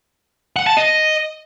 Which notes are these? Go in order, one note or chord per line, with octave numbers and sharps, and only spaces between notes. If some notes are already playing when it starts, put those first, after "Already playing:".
F#5
A5
D#5